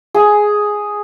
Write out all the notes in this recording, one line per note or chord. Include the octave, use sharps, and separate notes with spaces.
G#4